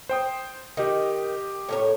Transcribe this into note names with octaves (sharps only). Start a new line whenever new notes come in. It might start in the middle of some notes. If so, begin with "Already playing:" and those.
C5 G5 D#6
D#3 G4 D#5
A2 A#4 C#5